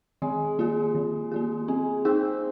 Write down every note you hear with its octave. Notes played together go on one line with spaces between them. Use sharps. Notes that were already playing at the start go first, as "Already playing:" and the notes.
D#3 G#3
A#3 F4 G#4
D#3
A#3 F4 G#4
G#3 C4
C4 D#4 G#4